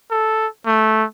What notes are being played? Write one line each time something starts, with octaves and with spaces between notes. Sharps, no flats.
A4
A3